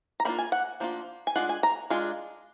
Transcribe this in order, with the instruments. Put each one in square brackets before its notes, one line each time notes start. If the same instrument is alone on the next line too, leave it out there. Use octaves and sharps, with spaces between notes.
[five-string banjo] A#5
F3 A#3 D4 F4 B5
G#5
F#5
F3 A#3 D4 F4
G#5
G#3 D4 F4 F#5
G#5
A#5
G#3 D4 F4